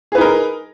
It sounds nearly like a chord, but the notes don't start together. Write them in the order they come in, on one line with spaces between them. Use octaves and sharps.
G#4 B4 D#4 A#4